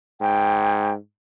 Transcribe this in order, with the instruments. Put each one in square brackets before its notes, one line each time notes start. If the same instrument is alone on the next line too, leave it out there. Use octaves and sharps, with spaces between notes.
[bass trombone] G#2 [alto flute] G5